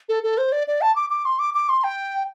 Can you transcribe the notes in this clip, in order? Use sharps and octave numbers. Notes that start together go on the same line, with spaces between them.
A4
A4
C5
D5
D5
A5
D6
D6
C6
D6
D6
C6
G5